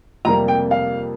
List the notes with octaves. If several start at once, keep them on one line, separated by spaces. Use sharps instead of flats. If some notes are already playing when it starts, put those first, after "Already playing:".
F2 C3 G3 A#3 A#5
G5
F5